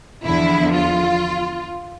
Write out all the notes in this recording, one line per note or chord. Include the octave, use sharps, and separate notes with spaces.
E2 D3 F3 E4
F4